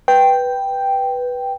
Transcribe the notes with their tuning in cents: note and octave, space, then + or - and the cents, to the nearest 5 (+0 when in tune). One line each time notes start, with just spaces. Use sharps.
B4 -5 G5 +0